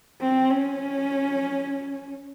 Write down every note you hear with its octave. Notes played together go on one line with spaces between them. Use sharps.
C4
C#4